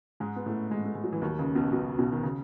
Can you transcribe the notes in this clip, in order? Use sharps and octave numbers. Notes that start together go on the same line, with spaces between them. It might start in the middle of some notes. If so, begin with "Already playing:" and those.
G#2 G#3
B3
A2 A3
G#2 G#3
A3
G#3
F#3
E3
D#2 D#3
C#2 C#3
B1 B2
B1 B2
B1 B2
D#3
C#3